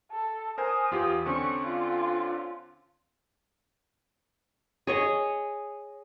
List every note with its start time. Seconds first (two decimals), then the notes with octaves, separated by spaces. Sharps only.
0.11 A4
0.58 A#4 C5 G#5 D#6
0.91 E2 F4 G4
1.26 D3 C4 C#4 C#6
1.63 F4
4.87 G#4 C#5 D#5